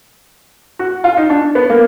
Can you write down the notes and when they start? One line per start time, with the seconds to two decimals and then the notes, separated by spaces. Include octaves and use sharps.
0.79 F#4
1.04 F4
1.17 D#4
1.30 D4
1.55 B3
1.70 A#3